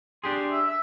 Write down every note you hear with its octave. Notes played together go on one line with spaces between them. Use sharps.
D4 G4 G#4 C6
E5
E5